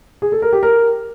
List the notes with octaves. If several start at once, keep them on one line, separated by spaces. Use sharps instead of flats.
G#4
A4
A#4
G4
A#4